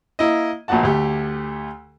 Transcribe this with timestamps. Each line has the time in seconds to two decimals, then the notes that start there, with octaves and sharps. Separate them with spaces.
0.19 A#3 E4 D#5
0.68 A#1 A#2 A3 F#4 F#5 A5
0.83 D2 A3 G4